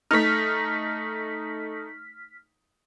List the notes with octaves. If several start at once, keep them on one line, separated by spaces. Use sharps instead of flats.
A3 D#4 F6 B6